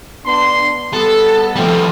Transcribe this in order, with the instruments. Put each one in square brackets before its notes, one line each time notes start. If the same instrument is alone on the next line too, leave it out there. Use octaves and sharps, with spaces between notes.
[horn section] B3 D4 C6
[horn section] G3 B3 [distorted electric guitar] A4
[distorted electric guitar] F3 G3 [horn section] A3 B3 C4